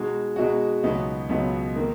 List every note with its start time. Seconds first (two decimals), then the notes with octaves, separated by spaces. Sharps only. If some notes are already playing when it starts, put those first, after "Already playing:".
Already playing: B2 G#3 D#4 F#4
0.36 B2 G#3 D#4 F#4
0.83 C#2 B2 F#3 B3 D#4
1.29 C#2 B2 F#3 B3 D#4
1.76 D#3 A#3